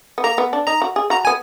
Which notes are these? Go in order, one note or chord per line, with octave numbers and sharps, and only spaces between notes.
B3
A#3 A#5
B3
D4
D#4 A#5
F#4
G#4
F#4 A#5
B3 G#5